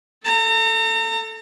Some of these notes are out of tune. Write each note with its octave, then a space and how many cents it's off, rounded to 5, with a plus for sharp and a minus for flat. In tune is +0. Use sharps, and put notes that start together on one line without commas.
A4 +0 A#5 -40